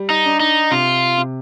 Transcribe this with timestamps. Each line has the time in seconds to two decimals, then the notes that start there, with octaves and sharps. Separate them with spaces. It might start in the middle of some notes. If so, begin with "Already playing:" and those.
Already playing: G3
0.10 D#4
0.26 D4
0.40 D#4
0.71 C3 F4
1.17 C3